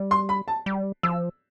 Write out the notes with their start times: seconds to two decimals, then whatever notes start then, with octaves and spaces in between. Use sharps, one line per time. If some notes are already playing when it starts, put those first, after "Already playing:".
Already playing: G3
0.11 C6
0.29 B5
0.48 A5
0.66 G3
1.03 F3 E6